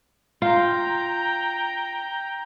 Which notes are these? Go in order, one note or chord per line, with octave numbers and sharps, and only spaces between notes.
F4 G5 A#5